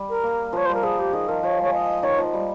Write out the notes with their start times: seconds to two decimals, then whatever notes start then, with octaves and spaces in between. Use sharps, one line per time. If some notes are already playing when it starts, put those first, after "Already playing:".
Already playing: G3
0.09 A#4
0.23 A#3
0.53 F3 C#5
0.65 G3 C5
0.74 A#4
0.83 F3 G#4
0.98 G4
1.13 D#3 G#4
1.28 F3 A#4
1.43 F3 C#5
1.59 G#3 C#5
1.73 D#5
2.03 D#3 C#5
2.19 F3
2.33 G3